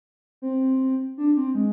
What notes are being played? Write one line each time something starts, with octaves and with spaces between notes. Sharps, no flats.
C4
D4
C4
G#3